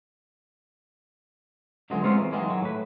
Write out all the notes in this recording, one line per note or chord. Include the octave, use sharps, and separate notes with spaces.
C#2 D3 E3 F#3 G#3
G#3 B3 C4 F4 F#4 A#4
E3
D#3 E3 F#3 G#3 A#3
F#3
A2 B4